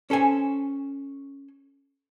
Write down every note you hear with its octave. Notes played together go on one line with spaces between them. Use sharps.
C#4 A4 C5 G#5